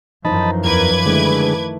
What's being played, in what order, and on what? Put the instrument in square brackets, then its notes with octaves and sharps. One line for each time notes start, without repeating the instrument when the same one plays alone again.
[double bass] F#2 F3 [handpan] E3 D#4 C5 [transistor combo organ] D#5 A5 B5
[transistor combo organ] E2 A#4 [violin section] B4 D6 G#6
[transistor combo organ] D3 G#3 [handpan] D#3 A3 E4